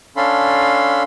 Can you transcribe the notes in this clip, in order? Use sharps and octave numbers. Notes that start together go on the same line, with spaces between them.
C#4 D4 A4 F5 B5 C6